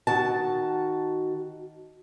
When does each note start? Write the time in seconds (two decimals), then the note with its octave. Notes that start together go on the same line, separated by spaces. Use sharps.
0.07 D#3 F#4 A5